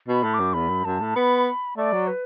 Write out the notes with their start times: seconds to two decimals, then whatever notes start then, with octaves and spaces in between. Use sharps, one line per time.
0.08 B2
0.13 B5
0.23 A2
0.34 D6
0.39 F#2
0.53 E2 B5
0.69 F#2
0.85 F#2 A5
1.00 A2
1.16 B3 B5
1.77 A3 D5
1.93 F#3
2.07 B4